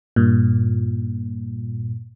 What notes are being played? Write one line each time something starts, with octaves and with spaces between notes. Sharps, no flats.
G2 A#2